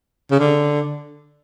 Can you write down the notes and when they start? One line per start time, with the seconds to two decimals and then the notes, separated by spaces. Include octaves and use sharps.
0.31 C#3
0.40 D3